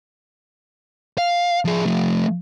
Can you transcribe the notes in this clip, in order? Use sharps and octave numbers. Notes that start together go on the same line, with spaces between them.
F5
F3 G#4
F3 A3